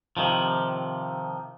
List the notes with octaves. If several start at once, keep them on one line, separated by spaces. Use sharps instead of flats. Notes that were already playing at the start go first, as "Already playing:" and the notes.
C3 D#3 F3